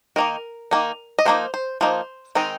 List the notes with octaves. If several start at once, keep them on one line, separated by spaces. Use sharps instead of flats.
D#3 A#3 D#4 A#4
D#3 A#3 D#4
D#5
F3 A#3 D#4 C5
C5
F3 A#3 D#4 C5
D#3 G#3 C4 D#4